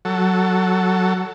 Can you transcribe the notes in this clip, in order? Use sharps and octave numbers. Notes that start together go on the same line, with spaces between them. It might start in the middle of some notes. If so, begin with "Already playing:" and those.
F#3 A4